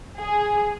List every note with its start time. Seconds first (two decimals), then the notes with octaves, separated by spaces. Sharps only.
0.18 G#4